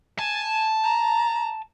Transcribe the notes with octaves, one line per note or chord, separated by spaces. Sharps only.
G#5 A5
A#5